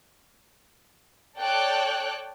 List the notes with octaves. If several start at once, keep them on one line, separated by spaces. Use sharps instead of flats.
A4 C#5 D5 G5 A5 F#6